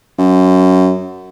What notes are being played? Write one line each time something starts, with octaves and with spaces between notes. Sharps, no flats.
F#2